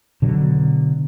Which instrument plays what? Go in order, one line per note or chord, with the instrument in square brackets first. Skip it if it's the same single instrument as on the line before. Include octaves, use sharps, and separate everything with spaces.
[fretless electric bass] B2 D3 F#3